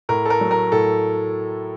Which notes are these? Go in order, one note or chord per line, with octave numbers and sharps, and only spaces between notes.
A2 A#4
A4
A#4
F#3
A#4
A2 A4